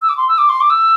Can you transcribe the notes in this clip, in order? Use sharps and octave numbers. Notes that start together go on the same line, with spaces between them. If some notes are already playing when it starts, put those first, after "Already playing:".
E6
D6
C6
E6
D6
C6
D6
E6